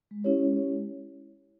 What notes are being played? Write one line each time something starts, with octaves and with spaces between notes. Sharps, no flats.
G#3
C#4 E4 G4 C#5
G#3
C#4 E4 G4 C#5
G#3